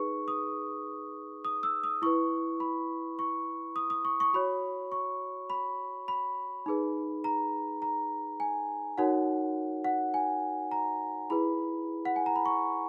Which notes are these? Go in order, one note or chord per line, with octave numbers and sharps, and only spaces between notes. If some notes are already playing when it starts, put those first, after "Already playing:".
Already playing: D#4 G#4 B4 C#6
D#6
D#6
E6
D#6
E4 B4 C#6
B5
C#6
D#6
D#6
C#6
C#6
F#4 C#5 B5
C#6
B5
B5
D#4 G#4 B4
A#5
A#5
G#5
D#4 F#4 A#4 C#5 F#5
F#5
G#5
A#5
E4 G#4 B4 B5
F#5
G#5
A#5
B5
C#6